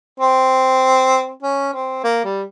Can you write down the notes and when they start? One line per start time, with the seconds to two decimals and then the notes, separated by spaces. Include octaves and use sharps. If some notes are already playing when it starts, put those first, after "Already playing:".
0.20 C4
1.43 C#4
1.73 C4
2.04 A#3
2.24 G3